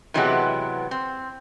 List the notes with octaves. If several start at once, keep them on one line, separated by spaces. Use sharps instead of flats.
C3 E3 F#3 G#3 B3 G4
C4